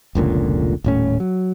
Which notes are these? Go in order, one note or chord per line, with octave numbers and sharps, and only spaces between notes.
F1 C#2 A#2 D3
D#1 A2 C#4
F#3